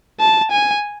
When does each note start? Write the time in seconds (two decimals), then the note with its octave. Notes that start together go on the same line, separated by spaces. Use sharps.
0.20 A5
0.52 G#5